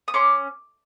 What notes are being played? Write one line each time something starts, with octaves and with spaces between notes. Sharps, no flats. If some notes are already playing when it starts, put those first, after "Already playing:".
D#6
C#4 C6 D6